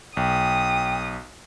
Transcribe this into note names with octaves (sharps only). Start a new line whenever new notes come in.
B1 G5 D#6